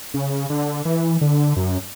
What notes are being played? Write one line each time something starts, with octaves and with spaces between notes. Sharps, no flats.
C#3
D3
E3
D3
F#2